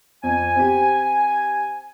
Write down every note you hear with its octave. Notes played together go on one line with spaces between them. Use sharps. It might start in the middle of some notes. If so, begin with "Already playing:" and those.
F2 G#5
C4 G4